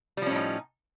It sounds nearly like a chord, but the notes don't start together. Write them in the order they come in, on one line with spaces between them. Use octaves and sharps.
G3 F3 C#4 A2 D#4